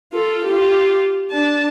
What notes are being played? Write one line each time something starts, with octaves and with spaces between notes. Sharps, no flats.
F4 A4
F4 G4
D4 A5